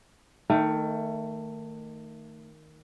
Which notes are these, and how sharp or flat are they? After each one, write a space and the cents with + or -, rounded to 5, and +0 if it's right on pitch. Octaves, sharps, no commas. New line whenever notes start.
D#3 +0 A3 +25 E5 +30